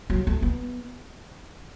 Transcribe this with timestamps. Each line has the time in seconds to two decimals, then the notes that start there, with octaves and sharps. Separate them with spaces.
0.10 F#3
0.27 A3
0.42 B3